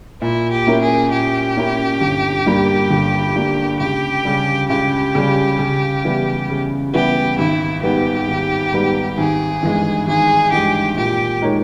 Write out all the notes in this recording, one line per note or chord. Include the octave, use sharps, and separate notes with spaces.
A#2 E4
G4
A#3 C#4 E4 A#4
G#4
A#2 G4
A#3 C#4 E4 A#4
G1
G2 G3 A#3
G1
G2 G3 A#3
C#2 G4
C#3 G3
C#2 G4
C#3 G3
C#3
E3 G3 B3 E4
C#3
E3 G3 B3 E4 G4
G#1 E4
G#2 G3 B3 G4
G#1
G#2 G3 B3
G#1 G#4
G2 E3 G#3
G#1 G#4
G2 E3 G#3 G4
A#2 G4
G#3 D#4 A#4 C#5